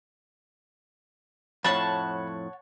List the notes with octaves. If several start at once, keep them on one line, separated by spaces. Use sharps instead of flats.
F2 A2 C#5 F#5 A5 B5